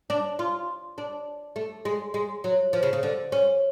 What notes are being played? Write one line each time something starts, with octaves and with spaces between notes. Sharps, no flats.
D4
F4
D4
A3
G#3
G#3
F#3
F3
C#3
C#3
D3
C#4